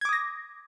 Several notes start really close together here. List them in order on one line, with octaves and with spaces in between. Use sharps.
G#6 D6 D#6 A#6